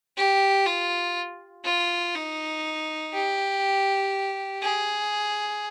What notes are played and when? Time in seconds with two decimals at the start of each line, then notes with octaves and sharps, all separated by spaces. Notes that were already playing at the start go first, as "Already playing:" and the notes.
0.17 G4
0.67 F4
1.65 F4
2.15 D#4
3.13 G4
4.63 G#4